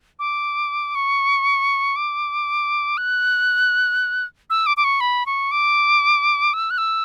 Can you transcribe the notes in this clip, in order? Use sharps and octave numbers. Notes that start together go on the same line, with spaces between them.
D6
C#6
D6
F#6
E6
D6
D6
C#6
B5
C#6
D6
E6
F#6
E6